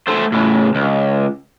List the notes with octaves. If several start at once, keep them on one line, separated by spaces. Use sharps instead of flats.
A3 C5
A2 C#3
C#2